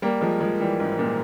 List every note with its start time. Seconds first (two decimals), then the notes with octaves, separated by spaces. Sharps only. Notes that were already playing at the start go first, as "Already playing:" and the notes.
0.02 G3 A#3
0.21 F3 G#3
0.40 F3 G#3
0.60 E3 G3
0.80 G#2
0.99 A#2